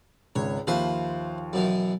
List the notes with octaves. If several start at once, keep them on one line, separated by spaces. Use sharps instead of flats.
G#1 C#2 C#5
D#2 F3 B4 C5 E5 F5
F#2 B2 E3